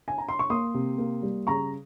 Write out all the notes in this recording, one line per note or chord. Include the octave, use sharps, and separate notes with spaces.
G#5
A#5
C6
C#6
A#3 C6 D#6
C3
A#3
G3
C#3 A#5 C#6